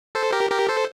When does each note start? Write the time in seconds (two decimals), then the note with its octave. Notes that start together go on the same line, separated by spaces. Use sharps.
0.15 A4 C5
0.32 G4 A#4
0.50 G4 A#4
0.69 A4 C5